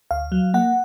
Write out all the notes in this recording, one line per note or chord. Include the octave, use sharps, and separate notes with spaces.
D2 F5
F#3
A#3 F#5